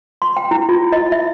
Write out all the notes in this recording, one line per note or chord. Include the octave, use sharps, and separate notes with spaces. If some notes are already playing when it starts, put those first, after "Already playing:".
C6
G5
E4
F4
D#5
E5